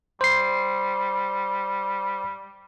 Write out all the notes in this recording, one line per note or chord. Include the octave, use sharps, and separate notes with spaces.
G3 C5 C7